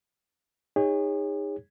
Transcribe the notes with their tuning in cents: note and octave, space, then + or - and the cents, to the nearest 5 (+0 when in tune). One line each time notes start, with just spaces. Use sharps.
D#4 +0 G#4 -40 C#5 -5